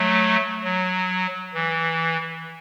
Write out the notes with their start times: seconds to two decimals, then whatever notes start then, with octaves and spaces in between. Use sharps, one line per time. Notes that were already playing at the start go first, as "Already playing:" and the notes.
Already playing: F#3 A3
0.64 F#3
1.54 E3